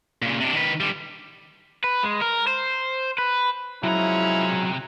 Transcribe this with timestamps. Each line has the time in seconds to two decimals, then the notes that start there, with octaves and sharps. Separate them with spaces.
0.22 A#2 C#3
0.40 C3 D4
0.54 D#3 B4
0.80 D3 G3
1.84 B4
2.03 G#3
2.21 A#4
2.47 C5
3.18 B4
3.83 C3 F3 F#3 G#3 C#4 E4 A#5